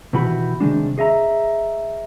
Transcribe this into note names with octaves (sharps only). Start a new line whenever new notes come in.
B2 D#3 E3 F#4 G4 B5
C3 D#3 F3 G#3 D4
G#4 D#5 E5 A#5